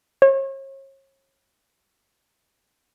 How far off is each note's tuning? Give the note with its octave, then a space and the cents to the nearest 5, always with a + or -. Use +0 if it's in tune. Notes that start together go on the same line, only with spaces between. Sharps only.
C#5 -40